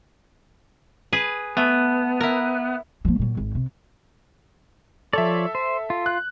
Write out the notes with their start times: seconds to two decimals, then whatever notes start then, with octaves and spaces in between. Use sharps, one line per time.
1.13 G#4 B4
1.57 A3 B3
2.20 E4 A#4
3.05 F3 A#3
3.19 A#2 F#3
3.37 G#1
3.55 C3
5.13 F3 A4 C#5 D5 E5
5.55 C5
5.90 F4
6.06 F#6